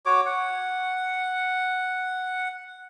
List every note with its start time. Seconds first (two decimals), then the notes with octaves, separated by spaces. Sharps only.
0.06 F#4 C#5 D6
0.26 F#5